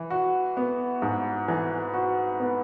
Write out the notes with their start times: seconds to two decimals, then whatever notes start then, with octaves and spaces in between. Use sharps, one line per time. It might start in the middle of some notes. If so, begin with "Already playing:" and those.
Already playing: E3
0.10 F#4
0.57 B3
1.02 G#2
1.48 E3
1.94 F#4
2.40 B3